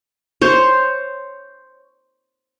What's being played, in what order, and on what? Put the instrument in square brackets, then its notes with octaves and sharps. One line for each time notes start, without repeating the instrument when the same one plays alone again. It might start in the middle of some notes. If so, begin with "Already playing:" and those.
[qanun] C5 C#5